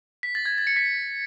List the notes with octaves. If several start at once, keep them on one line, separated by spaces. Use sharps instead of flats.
B6
A6
G#6
A6
C#7
B6